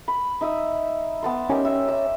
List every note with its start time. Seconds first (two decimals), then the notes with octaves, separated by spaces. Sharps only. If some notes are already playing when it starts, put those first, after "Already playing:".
0.08 B5
0.41 D#4 E5 D#6
1.23 B3 A5 C6
1.50 C#4 D#4 G4 A#4
1.65 E5
1.88 E5